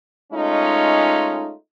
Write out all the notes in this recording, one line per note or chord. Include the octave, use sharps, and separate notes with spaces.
G#3 A3 C#4 D#4 F4